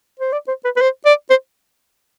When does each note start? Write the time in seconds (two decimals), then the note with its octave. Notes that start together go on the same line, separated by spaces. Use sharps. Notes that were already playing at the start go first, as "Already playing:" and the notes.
0.20 C5
0.32 D5
0.48 C5
0.65 B4
0.76 B4
0.81 C5
1.05 D5
1.30 C5